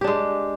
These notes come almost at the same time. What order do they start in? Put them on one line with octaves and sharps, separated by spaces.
G4 D4 G#3